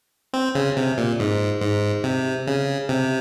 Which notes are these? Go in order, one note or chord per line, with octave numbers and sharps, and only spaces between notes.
C4
C#3
C3
A#2
G#2
G#2
C3
C#3
C3